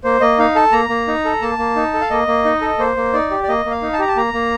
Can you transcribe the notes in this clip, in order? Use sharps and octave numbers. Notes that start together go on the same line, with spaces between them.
A#3 C5
A#3 D#5
D#4 F5
A4 A5
A#3 A#5
A#3
D#4
A4
A#3 A5
A#3
D#4
A4
F5
A#3 D#5
A#3
D#4
A4
A#3 C5
A#3
D#4 D5
G4
D5
A#3 D#5
A#3
F5
D#4
A5
G4 A#5
A5
A#3 A#5
A#3